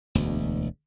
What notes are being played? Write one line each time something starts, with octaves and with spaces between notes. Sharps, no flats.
E1 D2